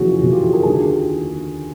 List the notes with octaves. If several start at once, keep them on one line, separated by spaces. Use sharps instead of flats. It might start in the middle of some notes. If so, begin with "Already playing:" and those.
Already playing: F#1 F2 C#3 E3 F#4 G#4
F4
F#1 F2 C#3 E3 F#4
F4 G4
F#4 G#4
G#4 A#4
D#2 D3 F#4 G#4
F4 G4